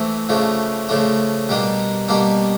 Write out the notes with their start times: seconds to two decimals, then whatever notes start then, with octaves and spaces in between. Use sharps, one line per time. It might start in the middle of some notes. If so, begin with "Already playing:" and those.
Already playing: E3 A3 C4
0.29 C#3 F3 A3 D4
0.89 C#3 F3 A3 D4
1.49 B2 G3 A#3 D4
2.09 B2 G3 A#3 D4